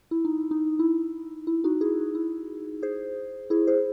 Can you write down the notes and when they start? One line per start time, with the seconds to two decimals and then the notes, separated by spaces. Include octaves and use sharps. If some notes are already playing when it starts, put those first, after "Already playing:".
0.11 E4
0.25 D#4
0.51 D#4
0.79 E4
1.47 E4
1.64 D#4 F#4
1.81 E4 G#4
2.15 E4
2.82 G#4 C5
3.50 E4 G#4
3.67 G#4 C5